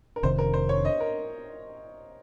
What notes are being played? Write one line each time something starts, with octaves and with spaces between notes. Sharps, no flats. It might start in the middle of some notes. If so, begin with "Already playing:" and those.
A#4
F1 F2 C3 D#3 C5
A#4
C5
C#5
D#5
A#4